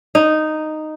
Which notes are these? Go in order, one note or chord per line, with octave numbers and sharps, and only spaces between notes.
D#4